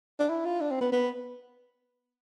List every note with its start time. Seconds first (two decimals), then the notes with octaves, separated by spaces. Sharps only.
0.19 D4
0.29 E4
0.45 F4
0.60 D4
0.71 C4
0.81 B3
0.92 B3